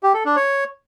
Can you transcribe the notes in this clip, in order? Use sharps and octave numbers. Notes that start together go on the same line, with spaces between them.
G4
A4
D4
C#5